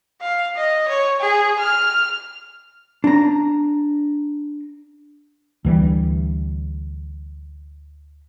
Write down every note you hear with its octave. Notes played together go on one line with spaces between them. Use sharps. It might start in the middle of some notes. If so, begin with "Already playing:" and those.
F5
D#5
C#5
G#4
F6
D4 A#5
D2 E3 G3